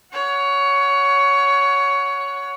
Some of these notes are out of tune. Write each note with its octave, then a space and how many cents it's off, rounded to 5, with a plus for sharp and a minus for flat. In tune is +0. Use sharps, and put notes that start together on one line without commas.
C#5 +15 F#5 -10